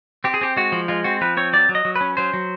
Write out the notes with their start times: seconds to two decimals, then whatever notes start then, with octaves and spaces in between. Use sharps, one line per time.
0.24 C4 G4
0.34 G#4
0.41 C4 G4
0.56 G#3 F#4
0.72 F3
0.88 G#3 F4
1.04 C4 F#4
1.21 F3 B4
1.37 C4 C#5
1.53 F#3 D5
1.69 F#3
1.75 D#5
1.85 F#3
1.96 B4
2.01 C#4
2.17 F#3 C5
2.34 F#3